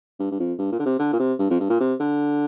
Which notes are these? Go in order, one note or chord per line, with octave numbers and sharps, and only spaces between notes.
G2
G2
F2
G2
A#2
D3
C3
D3
A#2
C3
G2
F2
G2
A#2
C3
D3